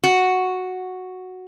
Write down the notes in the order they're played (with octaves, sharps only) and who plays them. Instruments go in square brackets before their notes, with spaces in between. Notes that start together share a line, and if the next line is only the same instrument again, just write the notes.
[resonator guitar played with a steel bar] F#4